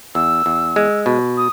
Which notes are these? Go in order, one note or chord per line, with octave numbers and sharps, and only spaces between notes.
E2 E6
E2
G#3
B2
D#6